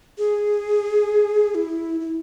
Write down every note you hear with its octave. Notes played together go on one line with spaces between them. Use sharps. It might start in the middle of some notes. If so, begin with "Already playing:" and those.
G#4
E4
E4